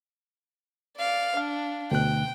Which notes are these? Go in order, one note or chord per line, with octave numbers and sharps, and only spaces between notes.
D5 F5
D4 F5
D2 B2 G5 F#6